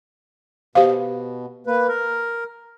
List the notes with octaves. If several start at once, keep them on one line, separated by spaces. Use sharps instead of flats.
B2 G4 C5 F5
A#3 B4
A#4